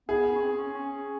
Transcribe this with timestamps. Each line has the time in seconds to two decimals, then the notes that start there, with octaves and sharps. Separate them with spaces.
0.09 B3 G#4
0.35 C#4
0.41 C4
0.57 C#4
0.74 C#4